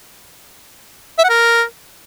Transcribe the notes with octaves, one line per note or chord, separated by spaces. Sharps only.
E5
F#5
A#4